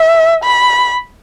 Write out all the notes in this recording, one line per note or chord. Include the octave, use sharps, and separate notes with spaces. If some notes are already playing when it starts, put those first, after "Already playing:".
Already playing: E5
B5